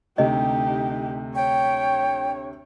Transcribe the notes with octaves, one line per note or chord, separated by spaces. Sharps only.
D2 C3 A3 D#4 G4 D#5
C#5 G5